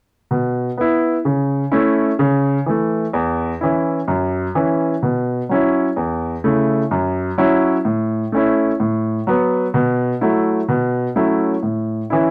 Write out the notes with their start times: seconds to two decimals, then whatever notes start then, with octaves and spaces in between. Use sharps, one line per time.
0.31 B2
0.78 B3 E4
1.25 C#3
1.72 A3 C#4 E4
2.19 C#3
2.66 E3 A3
3.13 E2
3.61 E3 C#4 E4
4.08 F#2
4.55 E3 C#4 E4
5.03 B2
5.49 F#3 C#4 E4
5.96 E2
6.44 C#3 A3 E4
6.91 F#2
7.38 F#3 C#4 E4
7.85 A2
8.32 A3 C#4 E4
8.80 A2
9.27 F#3 B3
9.74 B2
10.21 F#3 A3 E4
10.69 B2
11.16 F#3 A3 C#4 E4
11.63 A2
12.10 E3 C#4 E4